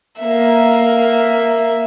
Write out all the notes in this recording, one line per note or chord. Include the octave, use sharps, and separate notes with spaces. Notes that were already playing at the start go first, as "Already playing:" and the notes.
A#3 E5